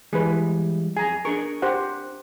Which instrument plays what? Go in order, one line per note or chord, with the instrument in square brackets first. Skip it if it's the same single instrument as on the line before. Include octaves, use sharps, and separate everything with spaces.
[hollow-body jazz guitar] E3 G3 G#3 [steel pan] G#4 B4
[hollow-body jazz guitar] F2 G#4 [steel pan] G#5 A#5
[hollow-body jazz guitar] D4 G#4 A#4 [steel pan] C#6
[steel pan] G4 C5 F#5